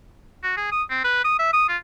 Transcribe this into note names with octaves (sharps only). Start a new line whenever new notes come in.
F#4
G#4
D#6
C4
B4
D#6
E5
D#6
F4